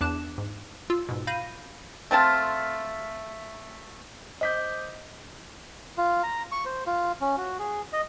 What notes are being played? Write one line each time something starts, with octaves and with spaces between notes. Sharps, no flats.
E2 D4 D6 F#6 E7
G#2
F4 E6
G#2 B2
F5 B5 G6 A#6 D#7
A3 C4 F4 A5
C5 D#5 D6 G6 B6
F4
A#5
C#6
C5
F4
C#4
F#4
G#4
D#5